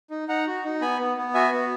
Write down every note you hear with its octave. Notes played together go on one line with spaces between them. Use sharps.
D#4
D#4 F#5 A#5
F#4
D#4
B3 G#5 B5
B3
B3
F#4 E5 G#5
B3